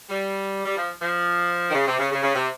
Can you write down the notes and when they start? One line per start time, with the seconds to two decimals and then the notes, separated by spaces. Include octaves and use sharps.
0.10 G3
0.65 G3
0.77 F3
1.00 F3
1.69 D#3
1.74 C#3
1.86 C3
1.99 C#3
2.11 C#3
2.23 C#3
2.35 C3